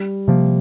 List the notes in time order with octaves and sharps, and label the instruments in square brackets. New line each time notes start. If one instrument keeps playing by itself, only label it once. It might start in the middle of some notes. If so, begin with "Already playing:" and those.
Already playing: [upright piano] G3
[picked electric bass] C3 F3 A#3